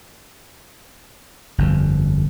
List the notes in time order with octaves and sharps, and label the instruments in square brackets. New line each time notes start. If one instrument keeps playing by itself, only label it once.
[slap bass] G1 F2